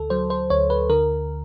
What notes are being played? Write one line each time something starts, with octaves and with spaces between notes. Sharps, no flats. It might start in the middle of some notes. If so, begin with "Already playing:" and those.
Already playing: D2 D3 A4
F#3 C5
C5
D2 C#5
B4
D3 A#4